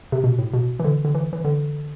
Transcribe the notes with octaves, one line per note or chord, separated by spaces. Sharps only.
C3
B2
A2
B2
E3
D3
D3
E3
E3
D3